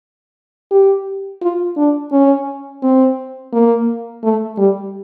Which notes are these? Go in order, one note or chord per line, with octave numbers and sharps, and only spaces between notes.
G4
F4
D4
C#4
C4
A#3
A3
G3